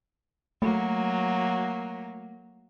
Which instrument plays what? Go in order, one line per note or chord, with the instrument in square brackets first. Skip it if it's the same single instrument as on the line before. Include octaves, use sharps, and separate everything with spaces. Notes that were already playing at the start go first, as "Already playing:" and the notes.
[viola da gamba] F#3 A#3 [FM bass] A3